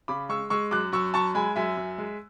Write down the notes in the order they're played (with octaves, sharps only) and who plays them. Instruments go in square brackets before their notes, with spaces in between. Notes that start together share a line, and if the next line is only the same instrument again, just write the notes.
[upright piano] C#3 B5 D6
G#3 C#6 E6
G#3 C#6 E6
F#2 D6 F#6
F#2 C#6 E6
F#2 A5 C#6
G#3 G#5 B5
F#2 E5 G#5
F#2
G#3